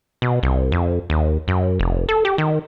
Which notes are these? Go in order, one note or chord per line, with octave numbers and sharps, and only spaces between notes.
B2
C2
F2
D#2
F#2
F1
A4
G4
D#3